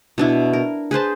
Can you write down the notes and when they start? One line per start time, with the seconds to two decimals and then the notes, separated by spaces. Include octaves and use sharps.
0.18 B2 D4 E4
0.53 A#4
0.91 G#4 B4 C5 A5